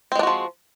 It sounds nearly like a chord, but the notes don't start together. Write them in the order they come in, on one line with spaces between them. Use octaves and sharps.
C4 G#3 D4 F#4 F3